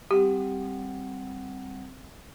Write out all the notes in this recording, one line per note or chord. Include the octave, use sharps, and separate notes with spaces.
G3 C4 G4 F#5